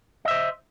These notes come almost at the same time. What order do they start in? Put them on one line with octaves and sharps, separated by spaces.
D#5 E5 C5